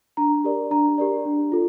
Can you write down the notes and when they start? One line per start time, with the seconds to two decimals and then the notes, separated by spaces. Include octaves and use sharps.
0.17 D4 A#5
0.44 G4 A#4 D5
0.71 D4 A#5
0.98 G4 A#4 D5
1.25 D4
1.52 F4 A4